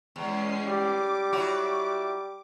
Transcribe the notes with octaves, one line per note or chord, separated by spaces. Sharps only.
E2 G#3 C#4 C7
G3 D6
F#3 E4 F#4